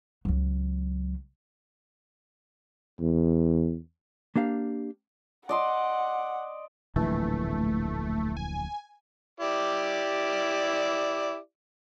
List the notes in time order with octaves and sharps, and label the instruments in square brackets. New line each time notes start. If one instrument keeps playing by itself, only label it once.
[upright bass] C#2 F#3
[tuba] E2
[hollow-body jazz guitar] A#3 D4 G4 F5
[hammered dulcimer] D5 D#5 C6 [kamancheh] F#5
[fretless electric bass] D1 A#1 E3 [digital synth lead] A3
[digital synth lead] G#5
[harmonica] E4 G4 D5